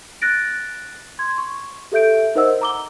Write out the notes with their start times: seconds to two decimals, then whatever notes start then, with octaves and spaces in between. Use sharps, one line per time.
0.22 F#6 A6 A#6 D7
1.19 C6 G#6
1.38 C#6
1.92 G4 A4 E5 G6 D7
2.35 D#4 A#4 C5 D#5 F#5 E6
2.61 A#5 D6 G7